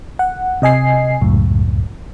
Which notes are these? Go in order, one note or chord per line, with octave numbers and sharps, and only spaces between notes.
F#5
C3 D#5 G#5 C7
C#2 F#2 A2